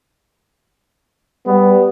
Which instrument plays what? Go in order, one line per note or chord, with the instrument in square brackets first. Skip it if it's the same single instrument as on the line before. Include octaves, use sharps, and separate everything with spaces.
[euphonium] G3 [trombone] B3